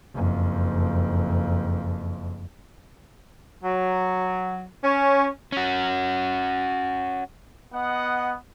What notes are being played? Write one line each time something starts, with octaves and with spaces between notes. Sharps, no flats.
F#1 F2
F#3
C#4
C#4 F#4
B3 D#5 F#5